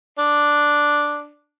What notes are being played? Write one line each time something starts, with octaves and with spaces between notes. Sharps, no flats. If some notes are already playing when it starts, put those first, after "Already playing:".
D4